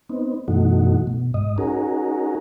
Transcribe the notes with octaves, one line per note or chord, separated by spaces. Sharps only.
B3 C4 D#4
F#2 B2 E3 A3 D#4 F#4
B2
G#2 D#5
C#4 D#4 F#4 G#4 A#4